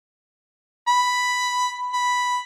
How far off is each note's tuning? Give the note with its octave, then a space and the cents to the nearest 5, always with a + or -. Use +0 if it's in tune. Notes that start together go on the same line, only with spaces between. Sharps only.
B5 +5
B5 +0